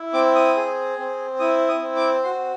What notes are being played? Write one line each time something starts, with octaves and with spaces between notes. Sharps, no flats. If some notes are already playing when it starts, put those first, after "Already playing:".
Already playing: E4
C4 D6
D#6
G#4
C4
E4 D#6
D#6
C4
D6
F#4 C6